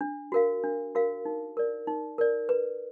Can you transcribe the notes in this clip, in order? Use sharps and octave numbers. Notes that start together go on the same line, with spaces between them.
D4
F#4 A#4 F5
D4
F#4 A#4 F5
D#4
A#4 D5
D#4
A#4 D5
B4